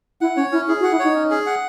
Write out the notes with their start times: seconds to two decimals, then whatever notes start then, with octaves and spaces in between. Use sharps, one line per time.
0.21 E4 F#5
0.37 C#4 C#5
0.52 C#4 E4
0.68 E4 G#4
0.80 F#4
0.84 F#5
0.91 E4
0.99 D#4 C#5
1.15 C#4
1.31 G#4
1.46 F#5